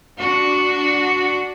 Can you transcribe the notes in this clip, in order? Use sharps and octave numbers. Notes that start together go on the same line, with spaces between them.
D4 F#4